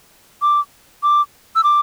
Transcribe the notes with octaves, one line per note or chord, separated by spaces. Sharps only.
D6
D6
E6
D6